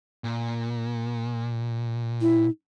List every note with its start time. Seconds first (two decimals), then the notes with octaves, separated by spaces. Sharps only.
0.24 A#2
2.21 E4